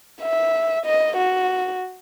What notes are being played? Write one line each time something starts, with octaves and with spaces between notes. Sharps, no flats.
E5
D#5
F#4